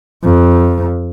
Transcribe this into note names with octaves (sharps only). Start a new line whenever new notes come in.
F2